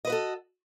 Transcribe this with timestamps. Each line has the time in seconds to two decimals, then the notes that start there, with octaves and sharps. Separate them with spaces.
0.05 D#5
0.07 B4
0.10 F#4
0.12 A4